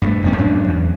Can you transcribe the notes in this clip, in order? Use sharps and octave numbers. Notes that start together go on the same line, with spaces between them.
G2 G#3 A3
F1 F2 B3 C#4
G#2 F#3 C#4 D4
E2